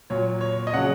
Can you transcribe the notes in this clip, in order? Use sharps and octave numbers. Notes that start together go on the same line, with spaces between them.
A#2 F#3 C#5
C#5
D#5
C#3 F#3 F#5